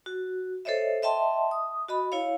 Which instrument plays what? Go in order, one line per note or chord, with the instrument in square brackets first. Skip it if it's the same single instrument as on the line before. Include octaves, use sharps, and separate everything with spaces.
[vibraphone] F#4
A4 C5 C#5 D#5 E5
D#5 E5 G5 A5 C6
D#6
F#4 D#5 B5
E4 C#5 F5